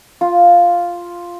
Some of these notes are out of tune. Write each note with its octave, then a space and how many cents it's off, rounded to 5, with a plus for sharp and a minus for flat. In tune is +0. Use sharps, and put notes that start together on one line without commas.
F4 +0